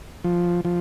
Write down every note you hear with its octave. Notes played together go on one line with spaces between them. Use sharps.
F3
F3